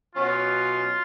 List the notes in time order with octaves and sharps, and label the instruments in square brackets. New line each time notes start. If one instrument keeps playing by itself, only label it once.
[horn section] B2 F#3 C#4 F4